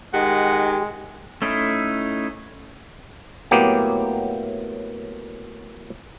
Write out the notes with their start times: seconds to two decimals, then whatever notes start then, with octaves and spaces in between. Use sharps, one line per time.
0.14 D#3 G#3 G4 F#5
1.42 A3 C#4 D#4 E4
3.51 A2 F#3 A#3 B3 G4